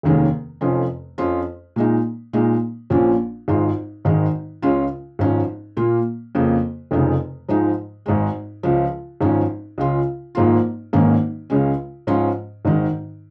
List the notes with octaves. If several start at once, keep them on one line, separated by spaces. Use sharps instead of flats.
F1 D#2 D#3 G#3 C#4
F1 F2 F3 C#4 F4
F2 F3 C#4 F4
A#2 G#3 D#4
A#2 G#3 D#4
A#1 A#2 F3 C#4
G#1 G#2 G#3 F4
G#1 G#2 D#3 G#3
C#2 C#3 G#3 C#4 F4
G#1 G#2 F3 C#4
A#2 A#3 F4
F2 C#3 A#3
F1 F2 C#3 G#3 D#4
G#2 F3 G#3 D#4
G#1 G#2 G#3
C#2 C#3 F3
G#1 G#2 F3 C#4
C#2 C#3 G#3 F4
G#1 G#2 F3 A#3 F4
G#1 G#2 D#3 A#3 C#4
C#2 C#3 G#3 C#4
G#2 F3 C#4 F4
G#1 G#2 D#3